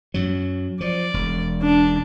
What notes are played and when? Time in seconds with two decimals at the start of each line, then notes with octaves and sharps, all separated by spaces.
0.14 F#2 F#3
0.81 F3 D5
1.14 E1
1.62 D4